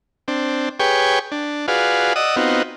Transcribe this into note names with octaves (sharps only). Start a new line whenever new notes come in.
C4 D4
G4 G#4 B4 C#5 G5 C#6
D4
F4 F#4 G#4 B4 D5 F5
D5 D#5 F#5 D#6 E6
B3 C4 D#4 F4 F#4